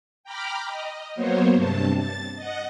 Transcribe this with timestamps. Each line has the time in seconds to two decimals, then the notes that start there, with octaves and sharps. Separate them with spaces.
0.24 G5 A#5 B5 D6 F6
0.68 D#5
1.15 F#3 A#3 B3 C5 C#5
1.54 G2 C3 A5
1.93 A6
2.36 D#5 F#5